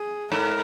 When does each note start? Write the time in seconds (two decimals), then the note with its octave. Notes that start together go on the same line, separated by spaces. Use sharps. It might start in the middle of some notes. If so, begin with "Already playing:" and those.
Already playing: G#4
0.32 G#2 A#4